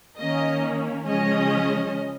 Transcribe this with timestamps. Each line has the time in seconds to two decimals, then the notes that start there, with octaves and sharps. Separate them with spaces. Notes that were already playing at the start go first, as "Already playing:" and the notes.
0.18 D#3 A#3 C#4 D#5
1.06 C#3 F3 G#3 C#4 D#5